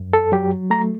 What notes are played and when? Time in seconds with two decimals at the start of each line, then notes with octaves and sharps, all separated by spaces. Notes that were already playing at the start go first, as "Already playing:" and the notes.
Already playing: F#2
0.13 A4
0.32 F#3 G4
0.70 A3 A#5